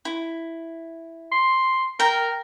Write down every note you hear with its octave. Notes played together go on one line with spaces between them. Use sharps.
E4
C6
A#4 G5 A#5